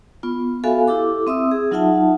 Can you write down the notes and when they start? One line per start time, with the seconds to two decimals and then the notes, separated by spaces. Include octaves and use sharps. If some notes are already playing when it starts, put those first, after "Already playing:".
0.23 B3 F4
0.64 B3 F#4 A4 E5 F5 G#5
0.88 E4 G4 A4 D6
1.27 C4 E5 D#6 E6
1.51 G#4
1.71 F#3 D#4 F4 E5 F#5 A5